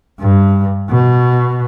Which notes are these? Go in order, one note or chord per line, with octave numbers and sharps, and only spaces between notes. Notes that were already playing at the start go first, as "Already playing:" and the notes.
G2
B2